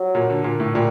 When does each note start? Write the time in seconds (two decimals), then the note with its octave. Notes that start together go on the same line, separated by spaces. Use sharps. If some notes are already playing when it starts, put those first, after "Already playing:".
Already playing: F#3
0.15 A#2
0.30 D3
0.44 A#2
0.60 A2
0.74 A#2 G3